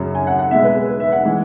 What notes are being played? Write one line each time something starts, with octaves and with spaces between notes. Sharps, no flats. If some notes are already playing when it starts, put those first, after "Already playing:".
Already playing: F#2 C#3 F#3
G#5
F#5
F#5
B2 G#3 E5
B4
G#4
B4
E5
F#5
E3 G#3